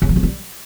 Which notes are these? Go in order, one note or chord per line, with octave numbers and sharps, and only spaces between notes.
C#3
F3
C#3
G3